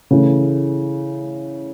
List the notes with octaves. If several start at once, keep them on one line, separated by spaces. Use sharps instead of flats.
C#3 E3 A3